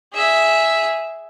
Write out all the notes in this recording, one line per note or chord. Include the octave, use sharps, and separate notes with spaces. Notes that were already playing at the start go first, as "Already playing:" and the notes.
G#4 E5